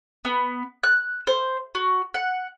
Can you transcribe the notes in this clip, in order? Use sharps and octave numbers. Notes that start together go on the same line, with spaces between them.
B3
F#6
C5
F#4
F#5